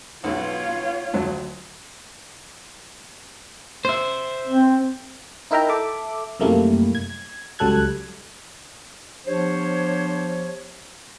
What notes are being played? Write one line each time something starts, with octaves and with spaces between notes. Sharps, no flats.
B1 B2 F4 C#5
G#1 D2 F#3
C5 E5
C4
D#4 E4 A#4 E5 G5 A#5
A4 E5 D6
F#2 C3 G3 A3 A#3 E4
G#6
C#2 F#3 G3 A4 F#6 G#6
F3 B3 D4 G4 C5 C#5